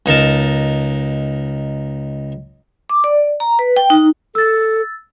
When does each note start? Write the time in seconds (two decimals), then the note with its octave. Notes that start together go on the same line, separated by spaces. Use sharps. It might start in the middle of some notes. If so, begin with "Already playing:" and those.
0.06 C#2 D#4 A#4 A5
2.90 D6
3.04 D5
3.40 A#5
3.59 B4
3.77 G5
3.90 D#4
4.35 A4 E6 A6